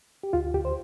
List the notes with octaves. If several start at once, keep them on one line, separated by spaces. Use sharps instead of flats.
G4
D2 F4
D2 G4
C5